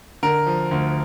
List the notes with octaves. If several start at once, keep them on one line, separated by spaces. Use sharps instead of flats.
D3 A#4
F3
D2